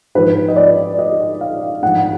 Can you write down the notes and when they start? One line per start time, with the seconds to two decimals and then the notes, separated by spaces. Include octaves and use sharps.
0.15 G#2 F3 B4
0.48 D#5
0.56 D5
0.99 D#5
1.41 F5
1.82 G#2 F3 F#5
2.02 F#5